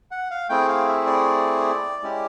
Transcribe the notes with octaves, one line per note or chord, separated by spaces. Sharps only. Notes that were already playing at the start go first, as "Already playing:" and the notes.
F#5
F5
A3 C4 E4 G#4 G5
F5
E5
D5
G#3 C#4 E4 G4